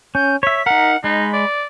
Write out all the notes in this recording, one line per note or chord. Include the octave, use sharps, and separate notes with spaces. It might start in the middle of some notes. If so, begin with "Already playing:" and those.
C#4 G6
C#5 E5 B6
D#4 A#4 F#5
G#3 D#4 B5
D5